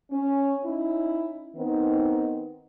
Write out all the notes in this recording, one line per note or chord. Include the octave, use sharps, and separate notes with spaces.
C#4
C#4 D#4 E4
D#3 B3 C4 D#4